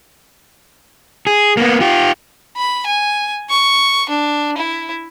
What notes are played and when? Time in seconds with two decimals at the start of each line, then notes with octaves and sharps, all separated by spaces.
1.27 G#4
1.57 A#3 B3
1.80 F4 G4
2.57 B5
2.86 G#5
3.50 C#6
4.09 D4
4.57 E4